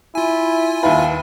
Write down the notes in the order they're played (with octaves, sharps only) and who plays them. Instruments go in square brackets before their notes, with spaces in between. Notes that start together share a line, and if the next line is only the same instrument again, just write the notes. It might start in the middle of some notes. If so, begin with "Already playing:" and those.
[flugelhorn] E4 [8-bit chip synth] F4 G#5
[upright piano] D#2 E4 B4 [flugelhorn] F5